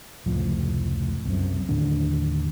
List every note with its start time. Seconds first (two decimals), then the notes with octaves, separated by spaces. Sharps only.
0.26 F1 C#2 A2 F3
1.25 C2 F#2 C3
1.69 D#2 A2 D3 D4